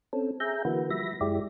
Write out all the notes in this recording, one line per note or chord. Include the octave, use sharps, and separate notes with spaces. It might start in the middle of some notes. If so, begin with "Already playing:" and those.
C4 C#4 A4
G#4 E5 A#5 G6
D3 E3 A#3 F#4 B4
F3 G3 E5 B5 A#6
F#2 G#3 E4 G4 D5